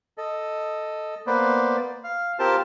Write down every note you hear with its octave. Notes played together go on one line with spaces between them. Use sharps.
A4 D#5
A#3 B3 B4 C5 D5
F5
C4 F4 G4 A#4 C5 A5